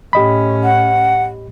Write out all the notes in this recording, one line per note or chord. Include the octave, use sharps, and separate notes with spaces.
A2 C#4 G4 D#5 B5
F#5